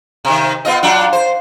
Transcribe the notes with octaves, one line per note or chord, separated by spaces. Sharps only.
C3 D#3
B3 F4 D#5
F#3 D4 F4
C5